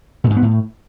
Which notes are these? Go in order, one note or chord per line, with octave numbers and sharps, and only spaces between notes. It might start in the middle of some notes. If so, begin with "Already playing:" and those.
B2
G#2
B3
A2